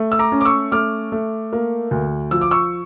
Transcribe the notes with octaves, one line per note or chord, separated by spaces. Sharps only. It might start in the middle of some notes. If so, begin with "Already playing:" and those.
Already playing: A3
E6
A#5 D6
C#4
D6
C#6 E6
A3 D6 F6
A3
A#3
D2
F3 E6
D6
C#6 E6